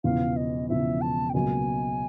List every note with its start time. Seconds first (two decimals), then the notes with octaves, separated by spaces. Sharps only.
0.04 E1 E2 C#3 F3 F5
0.37 D#5
0.69 E1 E2 C#3 F3 E5
1.02 A5
1.30 G5
1.34 C#2 B2 F#3 A#3 G#5